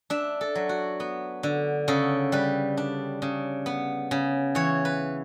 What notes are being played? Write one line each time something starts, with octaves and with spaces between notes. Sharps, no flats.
D4 E5
A4
F#3
F#4
B3
D3
C#3 A4
G3 B4
D4
C#3
B3
C#3
E3 C#5
B4